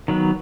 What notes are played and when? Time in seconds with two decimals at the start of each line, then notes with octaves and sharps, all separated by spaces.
0.08 D#3 F#3 B3